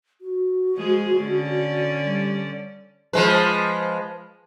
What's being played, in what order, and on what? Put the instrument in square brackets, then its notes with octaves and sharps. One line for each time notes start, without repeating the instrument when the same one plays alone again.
[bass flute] F#4
[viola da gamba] F3 G#3 G#4
D3 C#4 D5
[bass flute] G3
[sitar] F3 G#3 B4